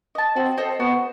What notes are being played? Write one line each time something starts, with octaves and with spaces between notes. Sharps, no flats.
D#5 A5
C4 F#4
A4 C5 D#5
B3 F#4